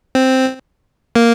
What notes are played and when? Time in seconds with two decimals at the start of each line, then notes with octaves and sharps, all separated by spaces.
0.15 C4
1.16 A#3